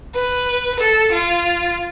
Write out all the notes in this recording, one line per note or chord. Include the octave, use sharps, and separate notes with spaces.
B4
A4
F4